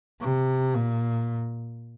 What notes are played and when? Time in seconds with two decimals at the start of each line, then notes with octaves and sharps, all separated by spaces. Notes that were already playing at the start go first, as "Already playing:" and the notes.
0.21 C3
0.74 A#2